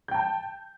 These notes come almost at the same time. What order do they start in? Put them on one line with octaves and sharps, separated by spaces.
G6 G5 A5